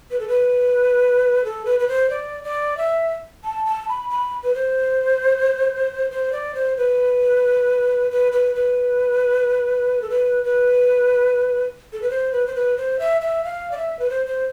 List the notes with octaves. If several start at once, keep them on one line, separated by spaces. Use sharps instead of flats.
B4
A4
B4
A4
B4
B4
C5
D5
D5
E5
A5
A5
B5
B5
B4
C5
C5
D5
C5
B4
B4
B4
B4
A4
B4
B4
A4
B4
C5
B4
C5
B4
C5
E5
E5
F5
D5
E5
B4
C5
C5